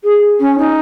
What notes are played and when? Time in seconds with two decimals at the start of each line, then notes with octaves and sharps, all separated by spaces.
0.04 G#4
0.40 C#4
0.58 D#4